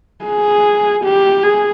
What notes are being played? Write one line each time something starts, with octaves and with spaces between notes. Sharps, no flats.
G#4
G4
G#4